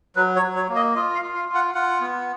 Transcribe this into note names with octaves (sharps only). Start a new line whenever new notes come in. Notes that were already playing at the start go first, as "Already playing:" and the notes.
F#3 B4
C#5
F#3
C#5
A#3
D#5
F4 D#5
F5
F4
F5
F4
F#5
F4 F#5
B3